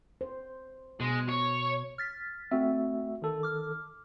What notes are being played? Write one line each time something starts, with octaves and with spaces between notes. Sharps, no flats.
C5
B2 G#3
C#5
F6 A6 B6
A3 C4 F#4 E5
D#3 A4
D6 F6